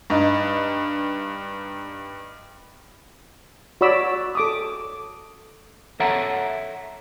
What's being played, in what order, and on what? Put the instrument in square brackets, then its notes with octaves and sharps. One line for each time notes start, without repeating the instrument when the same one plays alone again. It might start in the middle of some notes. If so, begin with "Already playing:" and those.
[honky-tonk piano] G2 D#4
[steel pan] F#4 C#5 D5 B5 D6 E6
A4 D6 D#6
[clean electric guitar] A4 C#5 E5 F#5 A5 A#5